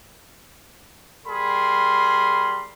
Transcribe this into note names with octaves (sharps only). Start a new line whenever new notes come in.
G3 G#4 A#4 B5 C6